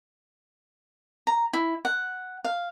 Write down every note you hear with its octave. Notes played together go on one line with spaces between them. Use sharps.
A#5
E4
F#5
F5